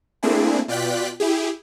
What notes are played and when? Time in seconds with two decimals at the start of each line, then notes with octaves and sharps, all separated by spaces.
0.23 A3 A#3 C4 D4 E4 G#4
0.68 B2 F4 D5 G5 F#6 B6
1.20 E4 G4 G#4